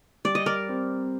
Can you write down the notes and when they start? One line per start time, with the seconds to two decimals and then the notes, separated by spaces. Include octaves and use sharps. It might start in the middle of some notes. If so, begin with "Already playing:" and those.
0.25 G3 D5
0.35 D#5
0.46 A#4 D5
0.69 C4